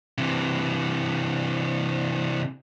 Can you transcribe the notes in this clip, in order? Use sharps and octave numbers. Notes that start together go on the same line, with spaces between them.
C3 E3